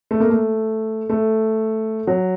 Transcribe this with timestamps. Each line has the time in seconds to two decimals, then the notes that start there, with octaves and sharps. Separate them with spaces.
0.11 A3
0.20 A#3
0.30 A3
1.09 A3
2.07 F#3